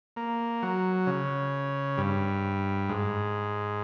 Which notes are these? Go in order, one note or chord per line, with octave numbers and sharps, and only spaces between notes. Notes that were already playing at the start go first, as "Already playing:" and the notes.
A#3
F#3
C#3
G2
G#2